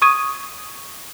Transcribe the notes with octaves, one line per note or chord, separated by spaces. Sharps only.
C#6 D#6 G#6 D#7